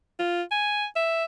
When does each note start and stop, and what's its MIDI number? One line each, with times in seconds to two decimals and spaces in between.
0.19 0.42 65
0.51 0.86 80
0.96 1.25 76